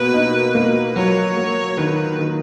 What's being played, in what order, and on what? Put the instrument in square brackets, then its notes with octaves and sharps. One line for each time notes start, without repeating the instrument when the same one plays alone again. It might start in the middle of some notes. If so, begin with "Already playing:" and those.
Already playing: [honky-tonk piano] B2 A#3 [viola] B4
[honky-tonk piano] D#4
A#3
[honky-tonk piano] F#3 [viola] C#5
[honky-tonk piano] A#3
[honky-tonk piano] D#3 [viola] B4
[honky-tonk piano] D#3